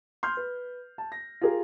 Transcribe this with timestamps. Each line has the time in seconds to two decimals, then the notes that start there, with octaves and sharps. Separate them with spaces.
0.23 C6 F6 G6
0.37 B4
0.98 A5
1.12 A#6
1.41 F4 G4 G#4 A#4